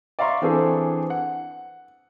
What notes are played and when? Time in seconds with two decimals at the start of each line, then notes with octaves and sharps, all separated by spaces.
0.19 D5 E5 F5 A#5 C6 C#6
0.42 E3 C4 D4 G#4 A4
1.10 F#5